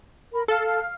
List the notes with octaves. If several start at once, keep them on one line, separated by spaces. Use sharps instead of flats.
A#4 B5
A4 F5 F6